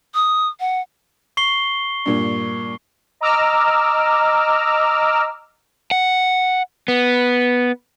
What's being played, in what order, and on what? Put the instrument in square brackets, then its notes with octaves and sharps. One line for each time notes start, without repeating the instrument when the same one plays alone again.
[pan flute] D#6
F#5
[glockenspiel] C#6 C7 G7
[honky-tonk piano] G2 A#2
[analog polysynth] D#5 A#5 D6 E6 F6
[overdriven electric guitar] F#5
B3